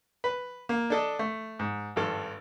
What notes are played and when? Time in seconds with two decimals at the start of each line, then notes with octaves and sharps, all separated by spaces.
0.24 B4
0.69 A#3
0.90 D4 A4 D#5
1.19 A3
1.59 G#2
1.96 G#1 G2 A4